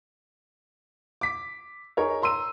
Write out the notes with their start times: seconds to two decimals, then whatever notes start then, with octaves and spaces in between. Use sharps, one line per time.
1.21 D6 B6
1.97 D#4 G#4 A#4 C#5
2.22 A#5 C6 E6 D#7